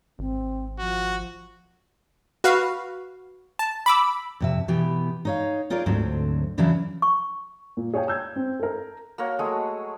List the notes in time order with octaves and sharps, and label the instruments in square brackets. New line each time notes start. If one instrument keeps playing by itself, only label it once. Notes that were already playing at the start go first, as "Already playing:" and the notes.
[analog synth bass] G#1 [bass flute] C4
[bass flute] F3 [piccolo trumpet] F#4
[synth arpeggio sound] F#4 B4 F5
A5
B5 D6 E6
[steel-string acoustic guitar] F2 C3 E5
B2 E3 B3 G4
D#4 C#5 F5
D#4 F4 G#4 A#4 C#5 D5
D2 G#2 D3 F#3 C4
E2 C#3 E3 F#3 D4 E4
[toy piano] C#6
[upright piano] A#2
G#4 C#5 F5 G5 G#5
E6 G6 G#6
C4
A4 A#4
[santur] A#3 F#4 A#4 C#5
F#3 G#3 A3 G#4